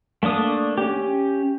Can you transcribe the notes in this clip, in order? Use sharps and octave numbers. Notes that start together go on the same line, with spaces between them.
A3 A#3 D4 D#6
C#4 G4